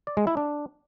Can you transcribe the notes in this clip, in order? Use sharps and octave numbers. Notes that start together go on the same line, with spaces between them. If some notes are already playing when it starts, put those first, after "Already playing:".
D5
G#3
E4
D4